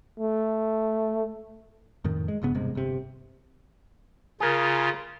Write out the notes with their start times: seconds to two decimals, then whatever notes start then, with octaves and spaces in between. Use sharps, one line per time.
0.19 A3
2.04 F2 A2 D#3
2.28 G#3
2.42 F#1 G2 C#3 B3
2.55 E1 G2 C3 G#3
2.75 G1 C3
4.40 C#3 F4 G#4 A#4